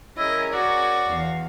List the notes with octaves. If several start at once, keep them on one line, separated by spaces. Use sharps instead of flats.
C#4 E4 G#4 A#4 D#5
F#4 D5 C#6
E2 E3 F5